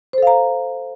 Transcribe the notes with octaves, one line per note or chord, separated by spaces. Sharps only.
A4 C5 F5 A#5